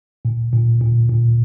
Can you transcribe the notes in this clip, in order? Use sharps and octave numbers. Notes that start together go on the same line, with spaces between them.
A#2
A#2
A#2
A#2